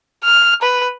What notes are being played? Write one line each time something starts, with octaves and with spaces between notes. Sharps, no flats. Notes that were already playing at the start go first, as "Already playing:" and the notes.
F6
B4